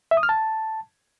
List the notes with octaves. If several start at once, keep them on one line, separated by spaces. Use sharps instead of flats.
E5
D#6
F6
A5